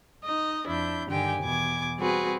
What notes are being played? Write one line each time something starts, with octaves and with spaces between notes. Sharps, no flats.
D#4 D#5
F2 D4 E4 G6
G2 D3 D#3 G4 G5 G#5
E2 B2 G#5 D6 G#6
G3 C4 F#4 G#4 B4